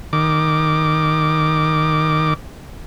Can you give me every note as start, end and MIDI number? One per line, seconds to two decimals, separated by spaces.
0.13 2.34 51
0.13 2.34 86